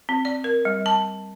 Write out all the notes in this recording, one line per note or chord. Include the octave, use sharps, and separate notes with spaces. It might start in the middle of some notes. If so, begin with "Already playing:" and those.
C4
D5
A#4
G3
A5